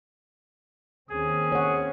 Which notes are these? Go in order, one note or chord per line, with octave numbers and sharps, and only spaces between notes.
D#2 C4 C#4 G#4
C#5 F#5